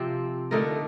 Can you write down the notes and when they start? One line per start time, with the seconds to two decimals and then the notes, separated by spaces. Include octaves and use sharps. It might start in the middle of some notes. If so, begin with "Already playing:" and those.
Already playing: C3 F3 C4
0.51 D3 A3 D#4 A#4